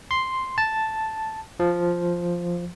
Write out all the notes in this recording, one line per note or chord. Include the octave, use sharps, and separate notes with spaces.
C6
A5
F3